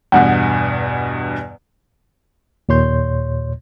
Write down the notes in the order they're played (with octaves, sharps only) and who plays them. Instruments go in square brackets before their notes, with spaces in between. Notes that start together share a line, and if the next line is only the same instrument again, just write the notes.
[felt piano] E2 G2 B2 [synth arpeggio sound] F#5
[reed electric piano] D#2 A#2 C#5 C6 G6